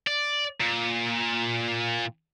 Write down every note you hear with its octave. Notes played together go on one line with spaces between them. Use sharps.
D5
A#2